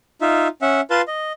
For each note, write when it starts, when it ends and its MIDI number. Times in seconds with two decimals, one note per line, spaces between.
0.21 0.48 63
0.21 0.48 65
0.21 0.48 76
0.62 0.81 61
0.62 0.81 76
0.62 0.81 78
0.90 1.02 65
0.90 1.02 71
0.90 1.02 77
0.90 1.02 81
0.90 1.02 84
1.08 1.32 75